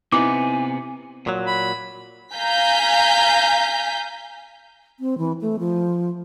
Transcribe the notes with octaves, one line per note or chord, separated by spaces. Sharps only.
C3 B3 C4 D#4 E4 B4 G#5 D6
A#2 F#3
B5
F5 G#5 A#5 G6 B6
C4
E3
A3
F3